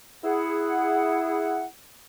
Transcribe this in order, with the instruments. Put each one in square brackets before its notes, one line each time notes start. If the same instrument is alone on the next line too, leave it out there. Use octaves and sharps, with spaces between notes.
[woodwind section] E4 G#4 F#5